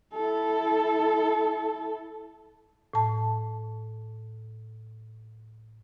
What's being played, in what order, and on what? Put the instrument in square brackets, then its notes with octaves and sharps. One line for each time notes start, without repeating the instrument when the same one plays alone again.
[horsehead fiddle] E4 A4
[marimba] A2 A5